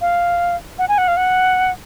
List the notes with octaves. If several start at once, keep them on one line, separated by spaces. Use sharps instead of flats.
F5
F#5
G#5
F#5
F5
F#5